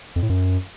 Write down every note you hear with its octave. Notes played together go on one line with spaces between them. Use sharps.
F2
A2
F#2